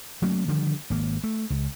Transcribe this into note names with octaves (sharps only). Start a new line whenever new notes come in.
F#3 A3 A#3 C#4
D3 D#3 F3 G3
G#1 A#3
A3
C#2